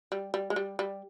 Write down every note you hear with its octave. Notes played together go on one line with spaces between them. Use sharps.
G3
G3
G#3
G3
G3